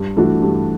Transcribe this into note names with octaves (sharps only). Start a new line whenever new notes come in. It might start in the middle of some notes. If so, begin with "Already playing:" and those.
Already playing: G2
E3 A3 D4 F#4
G2